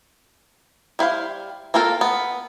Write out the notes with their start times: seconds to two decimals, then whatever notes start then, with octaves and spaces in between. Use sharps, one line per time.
0.99 G3 E4 C5 F5
1.74 A#3 C4 F4 A4 A#4
2.01 B3